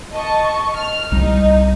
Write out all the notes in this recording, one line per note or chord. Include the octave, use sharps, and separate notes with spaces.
D#5 A5 C#6
F6
C2 G3 D#4